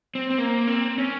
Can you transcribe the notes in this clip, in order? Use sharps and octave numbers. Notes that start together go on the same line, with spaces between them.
C4
C4
A#3
C4
C#4